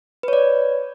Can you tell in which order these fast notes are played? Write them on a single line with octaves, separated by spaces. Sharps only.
B4 C#5 D5